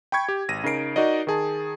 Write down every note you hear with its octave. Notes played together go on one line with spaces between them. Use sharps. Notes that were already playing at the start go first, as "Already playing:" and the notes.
G5 B5 C#6 G#6
G4
G#1 A#6 D#7
C#3 D#4 A#4 C7 D7
D#4 F#4 A#4 D5 D#5
D#3 G#4 A5